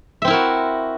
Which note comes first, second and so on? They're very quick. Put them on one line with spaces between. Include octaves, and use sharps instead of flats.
E5 C4 E4 A#4 F#4